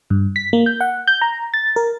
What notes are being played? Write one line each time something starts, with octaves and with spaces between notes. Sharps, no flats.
G2
B6
A#3
G6
F#5
G6
A#5
A6
A#4